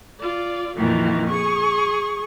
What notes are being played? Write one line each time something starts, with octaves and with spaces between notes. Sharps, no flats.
F4 D5
F2 A#2 D#3 E3
G#4 C#6